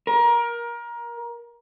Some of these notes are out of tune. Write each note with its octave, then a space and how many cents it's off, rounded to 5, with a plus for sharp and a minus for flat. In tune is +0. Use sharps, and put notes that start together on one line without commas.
A#4 +20